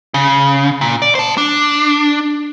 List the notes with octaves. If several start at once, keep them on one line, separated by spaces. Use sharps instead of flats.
C#3
A#2
D5
C5 A5
D4